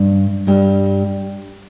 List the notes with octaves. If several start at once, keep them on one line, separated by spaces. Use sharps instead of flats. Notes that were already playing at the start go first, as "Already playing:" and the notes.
Already playing: G2
G2 G3